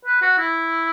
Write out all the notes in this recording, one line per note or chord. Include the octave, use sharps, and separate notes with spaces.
B4
F#4
E4